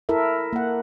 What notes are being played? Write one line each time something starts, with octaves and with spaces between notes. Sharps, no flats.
E4 A4 A#4 E5
A#3 F#5